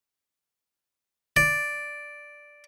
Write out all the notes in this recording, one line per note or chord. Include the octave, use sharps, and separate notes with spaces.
D5